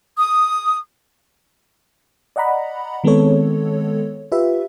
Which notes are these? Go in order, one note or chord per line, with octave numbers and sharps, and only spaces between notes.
D#6
D5 D#5 F#5 A#5 B5
D#3 G#3 B3 C4 A4 C#5
F4 G4 B4 E5